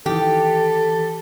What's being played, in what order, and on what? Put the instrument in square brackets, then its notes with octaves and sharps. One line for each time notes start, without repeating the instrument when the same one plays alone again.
[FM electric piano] D#3 E3 [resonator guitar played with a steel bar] G4 [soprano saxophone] A4